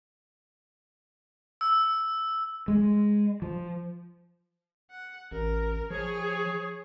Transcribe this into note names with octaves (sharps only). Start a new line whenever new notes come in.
E6
G#3
F3
F#5
A1 A#4
F3 G#4 C#5